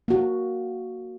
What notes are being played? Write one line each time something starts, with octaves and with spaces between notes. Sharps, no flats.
A#3 F#4